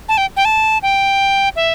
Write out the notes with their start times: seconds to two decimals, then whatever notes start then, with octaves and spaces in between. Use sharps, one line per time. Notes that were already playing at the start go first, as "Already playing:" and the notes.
0.08 A5
0.17 G5
0.37 G5
0.45 A5
0.83 G5
1.56 E5